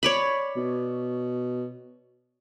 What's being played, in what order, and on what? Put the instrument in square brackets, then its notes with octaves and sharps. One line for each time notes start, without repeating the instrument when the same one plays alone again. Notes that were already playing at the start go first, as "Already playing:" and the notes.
[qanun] C#5 D5 B5
[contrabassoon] B2